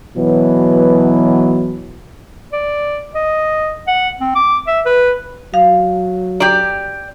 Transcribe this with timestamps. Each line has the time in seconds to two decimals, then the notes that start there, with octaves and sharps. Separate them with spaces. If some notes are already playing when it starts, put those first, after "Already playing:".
0.16 B2 E3 F#3
2.53 D5
3.15 D#5
3.88 F#5
4.21 C4
4.35 D6
4.67 E5
4.86 B4
5.54 F#3 F5
6.40 G4 D5 A#5